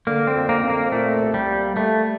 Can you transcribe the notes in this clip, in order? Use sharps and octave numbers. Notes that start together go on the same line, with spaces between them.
D3 A#3
C4
F2
A#3
C4
A#3
A#2 A3
C2
G3
A#3
G3 A3